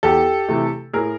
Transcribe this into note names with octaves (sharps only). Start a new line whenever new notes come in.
E2 G4 A4
C3 E3 A3
A2 G#4 A#4